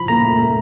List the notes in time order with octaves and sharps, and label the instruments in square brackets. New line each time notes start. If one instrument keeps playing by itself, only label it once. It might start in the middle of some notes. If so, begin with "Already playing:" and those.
Already playing: [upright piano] F3 [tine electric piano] B5
[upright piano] A#3 [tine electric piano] A#5
[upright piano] A3
A3